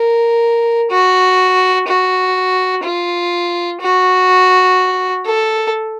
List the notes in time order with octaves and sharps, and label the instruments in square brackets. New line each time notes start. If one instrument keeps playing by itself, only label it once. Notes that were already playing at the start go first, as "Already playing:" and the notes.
Already playing: [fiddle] A#4
F#4
F#4
F4
F#4
A4